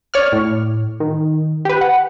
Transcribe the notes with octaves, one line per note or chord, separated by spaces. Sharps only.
C#5 D5 F6
A2
D#3
G4 B4
F#5